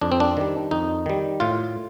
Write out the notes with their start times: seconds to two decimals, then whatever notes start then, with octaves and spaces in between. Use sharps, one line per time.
0.01 F2 D4
0.12 C4
0.20 D4
0.37 D#3 G3
0.71 F2 D#4
1.06 D#3 G3
1.40 A2 F4